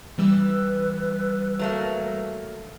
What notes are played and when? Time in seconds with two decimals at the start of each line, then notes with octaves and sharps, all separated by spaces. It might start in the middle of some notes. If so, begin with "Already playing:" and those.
0.18 E3 G3 B4 E6
1.59 F#3 A3 A#3